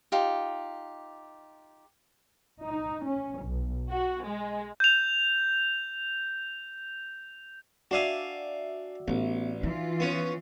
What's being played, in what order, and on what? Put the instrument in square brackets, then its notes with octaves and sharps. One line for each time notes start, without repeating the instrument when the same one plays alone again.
[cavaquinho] D#4 F4 G4
[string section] D#4
C#4
B1
F#4
G#3
[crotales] G6 F7
[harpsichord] D4 F5 G#5 [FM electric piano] F#4 D5 E5
[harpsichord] A1 [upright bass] B3
[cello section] E3 F4 [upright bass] D#4
[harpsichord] B3 C#4